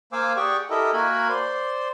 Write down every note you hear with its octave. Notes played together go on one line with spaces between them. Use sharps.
A#3 C5 F5 G#5 D6 E6
G4 G#4 D5 F#5 G5 C#6
E4 G4 A4 A#4 D#5 E5
A#3 F#4 A#4 G#5 B5
C5 D5 C6